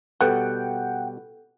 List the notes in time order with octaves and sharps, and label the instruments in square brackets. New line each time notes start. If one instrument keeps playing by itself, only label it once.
[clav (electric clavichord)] B2 G3 [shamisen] B3 [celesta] A4 [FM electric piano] F#5 G5